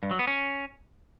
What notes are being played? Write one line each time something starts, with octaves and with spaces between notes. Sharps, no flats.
G2
F#3
B3
C#4